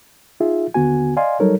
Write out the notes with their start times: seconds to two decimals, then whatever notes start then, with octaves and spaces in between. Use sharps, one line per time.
0.40 D#4 F4 G#4 E5
0.74 D#2 D3 B3 F#4 G#5
1.17 D5 D#5 F5 G#5 C6
1.40 F#3 G3 D#4 A4 A#4 C#5